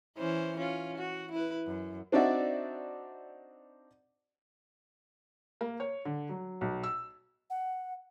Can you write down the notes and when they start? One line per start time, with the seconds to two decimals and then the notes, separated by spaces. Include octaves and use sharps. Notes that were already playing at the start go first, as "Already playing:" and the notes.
0.17 E3 C#4 C5
0.58 C#4 F4
0.98 F#4
1.32 E4 B4
1.67 F#2
2.12 C4 D4 D#4 F#4 D5 E5
5.61 A#3
5.80 C#5
6.05 D3
6.29 F#3
6.61 B1
6.83 E6
7.50 F#5